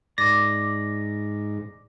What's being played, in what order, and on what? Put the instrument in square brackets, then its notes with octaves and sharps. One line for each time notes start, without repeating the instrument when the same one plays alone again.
[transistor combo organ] G#2 [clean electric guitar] D5 [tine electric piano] A#6